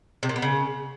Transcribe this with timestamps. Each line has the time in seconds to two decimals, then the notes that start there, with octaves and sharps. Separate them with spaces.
0.23 C3
0.29 A#2
0.36 B3
0.42 C#3